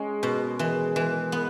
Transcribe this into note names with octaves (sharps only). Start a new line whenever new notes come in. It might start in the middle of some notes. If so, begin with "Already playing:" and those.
Already playing: G#3 C#4
B2
E3
E3
B3